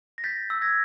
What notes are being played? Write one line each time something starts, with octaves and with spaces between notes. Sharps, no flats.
A#6
G6 A6 B6
E6
G#6 A#6